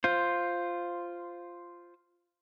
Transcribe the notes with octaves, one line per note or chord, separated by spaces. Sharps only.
F4 C5